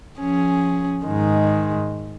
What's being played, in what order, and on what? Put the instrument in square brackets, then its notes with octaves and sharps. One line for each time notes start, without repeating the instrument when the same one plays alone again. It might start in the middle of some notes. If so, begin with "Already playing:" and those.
[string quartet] F3 C#4 G#4
G#2 D#3 G#3